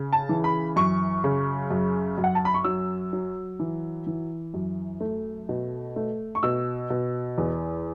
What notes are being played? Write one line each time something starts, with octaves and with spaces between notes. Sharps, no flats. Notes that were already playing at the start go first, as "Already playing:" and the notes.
Already playing: C#3
A5
E3
B5
F#2 C#6
C#3
F#2
F#2
F#5
A5
B5
C#6
F#3 E6
F#3
E3
E3
F#2
A3
B2
A3
C#6
B2 E6
B2
E2